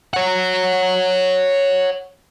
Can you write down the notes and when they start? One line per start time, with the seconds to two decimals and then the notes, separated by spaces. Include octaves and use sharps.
0.14 C#5 F#5